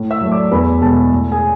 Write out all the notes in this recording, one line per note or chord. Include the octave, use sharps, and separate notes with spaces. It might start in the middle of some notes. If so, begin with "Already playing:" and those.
Already playing: A2
E5 E6
F#3 A3
D5 D6
E2 B4 B5
B2 G#3 A4 A5
A2
G#4 G#5